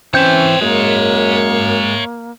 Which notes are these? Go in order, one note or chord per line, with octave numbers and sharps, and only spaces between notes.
E3 C4 C#4 C#5 E5 G6
F#2 G#3 A#3